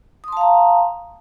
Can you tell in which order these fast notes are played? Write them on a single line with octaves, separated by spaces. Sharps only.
D#6 C6 A5 F5 A#5